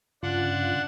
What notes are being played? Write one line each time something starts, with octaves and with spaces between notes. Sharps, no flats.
G2 C#3 D4 F4 F#5